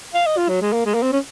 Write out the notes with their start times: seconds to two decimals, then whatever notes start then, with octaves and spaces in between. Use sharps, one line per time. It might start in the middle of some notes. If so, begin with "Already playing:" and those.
0.14 F5
0.26 D#5
0.37 F4
0.49 F#3
0.62 G#3
0.73 A#3
0.86 G#3
0.94 A#3
1.03 C4
1.13 C#4